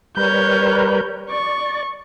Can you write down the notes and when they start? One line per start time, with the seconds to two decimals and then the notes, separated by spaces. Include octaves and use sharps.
0.17 G3 A#4 B4 C#5 G6
1.30 D5 C#6